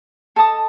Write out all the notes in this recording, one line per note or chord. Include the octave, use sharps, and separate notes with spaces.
A4 D#5 A5 D#6